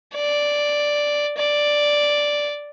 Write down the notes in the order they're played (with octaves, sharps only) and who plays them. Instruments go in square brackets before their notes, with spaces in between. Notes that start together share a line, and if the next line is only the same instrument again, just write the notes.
[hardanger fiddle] D5
D5